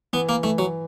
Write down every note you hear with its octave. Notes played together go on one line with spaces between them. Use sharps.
E3 B3
A#3
E3 A3
F#3